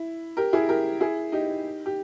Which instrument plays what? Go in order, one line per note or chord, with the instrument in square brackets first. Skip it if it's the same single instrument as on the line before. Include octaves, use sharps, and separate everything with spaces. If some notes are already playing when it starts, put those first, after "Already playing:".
Already playing: [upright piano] E4
G4 A#4
E4 G#4
G4 A#4
E4 G#4
D#4 G4
G4